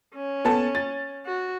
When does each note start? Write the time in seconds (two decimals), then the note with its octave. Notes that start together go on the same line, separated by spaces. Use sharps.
0.15 C#4
0.45 B3 A4 A5
0.75 A6
1.26 F#4